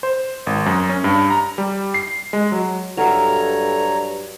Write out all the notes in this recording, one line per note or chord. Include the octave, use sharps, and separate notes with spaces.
C5
G#1
F#2
C#4
G2
A#5
G3
C7
G#3
F#3
G2 F#3 A4 A#4 C#5 E5 A#5